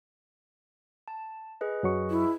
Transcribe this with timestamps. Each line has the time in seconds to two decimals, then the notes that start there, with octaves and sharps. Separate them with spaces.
1.08 A5
1.61 G#4 B4 D#5
1.83 F#2 F#3 C#6
2.10 E4